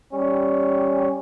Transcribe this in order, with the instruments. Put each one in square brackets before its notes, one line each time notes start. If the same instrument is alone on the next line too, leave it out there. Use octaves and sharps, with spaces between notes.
[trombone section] G3 C#4